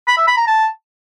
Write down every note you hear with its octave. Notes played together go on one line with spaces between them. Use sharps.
B5
E5
B5
A#5
A5